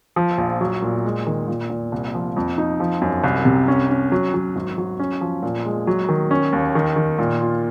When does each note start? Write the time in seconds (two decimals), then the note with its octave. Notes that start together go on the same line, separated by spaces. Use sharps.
0.16 F3
0.38 A#1
0.61 F#3
0.82 A#2
1.05 G#3
1.27 D#3
1.48 A#2
1.70 A#2
1.92 C2
2.14 F3
2.36 F2
2.58 D#4
2.80 F3
3.02 F#2
3.24 C2
3.45 C3
3.68 C#4
3.90 C#4
4.12 F#3
4.34 F#3
4.56 G#1
4.78 F#3
4.99 C#4
5.21 F3
5.43 A#2
5.66 G#3
5.87 F#3
6.09 D#3
6.31 C#4
6.52 D#2
6.75 D#3
6.96 D#3
7.19 A#2
7.40 F4